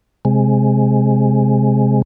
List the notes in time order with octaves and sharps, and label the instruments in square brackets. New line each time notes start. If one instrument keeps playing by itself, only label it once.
[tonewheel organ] C3 G#3